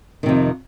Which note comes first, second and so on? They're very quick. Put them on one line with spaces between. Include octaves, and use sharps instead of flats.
D#3 C3 F2